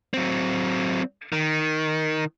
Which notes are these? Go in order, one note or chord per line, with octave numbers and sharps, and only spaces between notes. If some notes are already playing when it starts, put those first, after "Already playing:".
F#3 C4
D#3